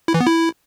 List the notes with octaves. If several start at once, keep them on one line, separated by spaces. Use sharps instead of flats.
E4
E3
B3
E4